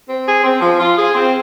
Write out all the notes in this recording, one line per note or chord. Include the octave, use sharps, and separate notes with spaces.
C4
G#4
C4
F3
F4
G#4
C4